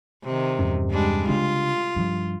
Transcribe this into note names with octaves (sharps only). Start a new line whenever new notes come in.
C3 D#3
E2 G2 C#4
G3 G#3 D4
C#3 G#3 D4 F4
G2 F3